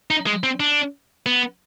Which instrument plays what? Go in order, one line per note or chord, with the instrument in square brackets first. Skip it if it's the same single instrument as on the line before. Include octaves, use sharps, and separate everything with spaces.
[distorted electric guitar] D#4
G#3
C4
D4
B3